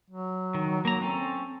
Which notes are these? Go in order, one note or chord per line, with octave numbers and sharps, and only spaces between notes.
F#3
D#3
A#3 A#5
C4 C#4 A4